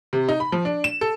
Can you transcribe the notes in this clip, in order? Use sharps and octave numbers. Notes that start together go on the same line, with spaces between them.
C3
D#4
B5
F3
D4
E7
A4